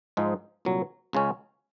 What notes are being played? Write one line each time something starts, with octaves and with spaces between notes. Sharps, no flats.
G#2 F3 G#3 D#4
C2 A#2 F#3
C#2 C#3 G#3 C#4